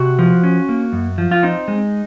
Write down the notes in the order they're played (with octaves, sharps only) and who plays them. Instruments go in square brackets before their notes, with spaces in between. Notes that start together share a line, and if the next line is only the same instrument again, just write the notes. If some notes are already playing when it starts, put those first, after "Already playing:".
Already playing: [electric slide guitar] C3 F#4
F3
C#4
A#3
F#2
F3
F4
C4 D#4
G#3